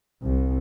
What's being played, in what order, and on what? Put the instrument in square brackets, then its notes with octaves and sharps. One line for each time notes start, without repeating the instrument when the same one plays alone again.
[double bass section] C2